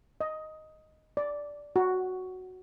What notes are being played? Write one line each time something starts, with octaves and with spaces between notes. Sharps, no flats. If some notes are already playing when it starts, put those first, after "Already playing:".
D#5
D5
F#4